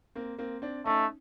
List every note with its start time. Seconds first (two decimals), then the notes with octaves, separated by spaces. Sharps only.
0.15 A#3 C4
0.39 A#3 C4
0.62 C4 D4
0.86 A3 C#4 D#4